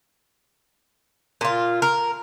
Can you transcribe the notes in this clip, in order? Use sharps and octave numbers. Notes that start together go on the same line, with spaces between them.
A#2 F4
A#4